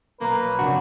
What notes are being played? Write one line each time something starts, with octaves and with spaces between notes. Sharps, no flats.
B1 A#3 B4 A#5
F1 C#3 D4 F#4